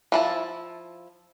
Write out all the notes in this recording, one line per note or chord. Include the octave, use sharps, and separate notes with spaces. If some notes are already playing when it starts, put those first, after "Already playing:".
F3 E4 A5